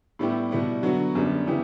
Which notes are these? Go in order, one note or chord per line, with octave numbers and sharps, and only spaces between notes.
A2 G3 B3 E4 G4
B2 G3 B3 E4
D3 F#3 B3 F#4
F#2 D3 G3 B3
C#3 E3 B3 E4 G4